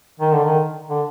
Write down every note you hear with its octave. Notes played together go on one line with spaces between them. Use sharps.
D#3
D3
D#3
D3